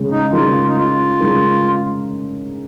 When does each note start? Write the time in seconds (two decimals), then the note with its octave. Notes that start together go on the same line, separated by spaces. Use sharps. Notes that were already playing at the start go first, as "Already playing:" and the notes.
Already playing: C#3 G#3
0.11 D#4
0.33 C#3 G#3 D#4 F4 A#4
0.67 D#4
0.76 F4
1.20 C#3 G#3 D#4 A#4